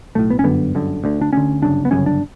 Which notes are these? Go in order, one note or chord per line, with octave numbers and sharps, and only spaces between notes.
B1 A2 A3
B3
C#4
G1 F#2 D3 B3
G1 F#2 D3
D2 D3
D4
D2 D3 C#4
G1 F#2 C#3 D4
B3
G1 F#2 C#3 C#4
D4